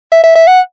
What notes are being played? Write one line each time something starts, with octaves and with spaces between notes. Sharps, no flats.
E5
E5
E5
F#5